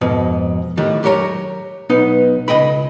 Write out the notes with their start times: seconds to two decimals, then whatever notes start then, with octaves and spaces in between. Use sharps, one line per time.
0.01 F2 G#2 B2
0.77 A2 D#3 G3
1.03 F#3 G4 A#4 C#5 A#5
1.89 B1 B3 D#4
2.48 C#2 F#3 D#5 G5 B5